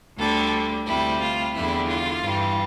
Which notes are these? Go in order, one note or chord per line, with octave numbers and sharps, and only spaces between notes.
D2 D3 G3 A4
D2 C3 G3 E4
F4
E2 D3 G3 E4
F4
G2 E3 G3